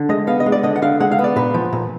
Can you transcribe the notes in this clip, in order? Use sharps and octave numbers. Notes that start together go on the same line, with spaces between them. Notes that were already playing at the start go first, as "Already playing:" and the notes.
Already playing: D3
G#3 D#5
B3 F5
D#5
G#3
D5
D3 D#5
F#5
D3 F5
G#3 F#5
F5
B3
D5
A#2 B4
F3
A#2